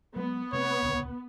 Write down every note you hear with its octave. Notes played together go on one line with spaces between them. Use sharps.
F#3 G#3 B3
C3 A3 C4 C#5
D#1 C#2 D3